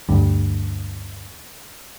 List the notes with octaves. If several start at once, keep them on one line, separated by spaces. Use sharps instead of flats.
D2 G2